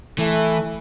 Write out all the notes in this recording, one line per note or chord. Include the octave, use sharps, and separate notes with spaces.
E3 A3